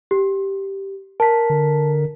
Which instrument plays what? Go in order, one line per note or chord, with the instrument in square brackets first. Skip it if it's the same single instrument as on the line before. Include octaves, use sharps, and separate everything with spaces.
[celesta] G4
[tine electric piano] A#4 B6 [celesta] A5
[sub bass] D3